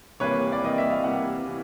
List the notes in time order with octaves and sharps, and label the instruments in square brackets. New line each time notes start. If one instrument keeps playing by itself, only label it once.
[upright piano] C3 E3 G3 A#3 B4 C#5
D5
C3 E3 G3 A#3 D#5
E5
F5
C3 E3 G3 A#3 E5 F#5
C3 E3